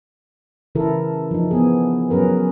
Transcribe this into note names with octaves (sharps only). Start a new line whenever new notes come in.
C#3 E3 E4 A4 A#4
F3 D#4
B3 G#4
F#3 C#4 G#4 A#4 B4